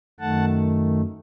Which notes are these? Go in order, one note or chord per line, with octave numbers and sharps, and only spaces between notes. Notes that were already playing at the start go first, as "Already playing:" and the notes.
F#2 D#3 A3 F#5 A5